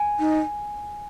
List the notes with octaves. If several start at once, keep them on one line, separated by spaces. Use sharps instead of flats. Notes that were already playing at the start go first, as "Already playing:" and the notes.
Already playing: G#5
D#4